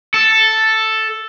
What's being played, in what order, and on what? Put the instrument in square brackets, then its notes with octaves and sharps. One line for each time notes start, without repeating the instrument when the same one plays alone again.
[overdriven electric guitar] A4